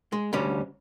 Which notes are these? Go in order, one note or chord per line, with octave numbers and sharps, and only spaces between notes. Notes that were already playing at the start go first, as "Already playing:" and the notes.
G#3
D2 G3 C#4